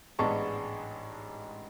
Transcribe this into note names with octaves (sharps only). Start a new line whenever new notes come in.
A1 G#2 G#3 B3 D4 A5 C#6